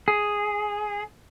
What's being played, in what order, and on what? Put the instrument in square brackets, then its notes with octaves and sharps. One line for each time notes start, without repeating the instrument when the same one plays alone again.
[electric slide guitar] G#4